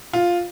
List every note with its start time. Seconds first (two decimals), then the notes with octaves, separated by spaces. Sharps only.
0.13 F4